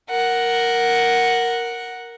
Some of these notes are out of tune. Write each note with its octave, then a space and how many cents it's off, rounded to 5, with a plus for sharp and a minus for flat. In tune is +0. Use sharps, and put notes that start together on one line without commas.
A#4 +0 F#5 +0